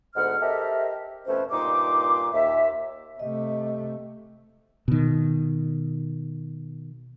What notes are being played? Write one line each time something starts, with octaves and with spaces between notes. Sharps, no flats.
D2 G#2 B3 F#5 F6
G4 A4 A#4 C5 D#5 E5
F2 B2 A3 C#4 B4 C5
G2 A#2 D#4 C6 D6
D#2 E5
C3 A3 D#5
B2 D#3